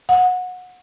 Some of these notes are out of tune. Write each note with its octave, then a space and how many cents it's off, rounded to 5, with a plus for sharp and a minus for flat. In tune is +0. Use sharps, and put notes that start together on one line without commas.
F#5 -25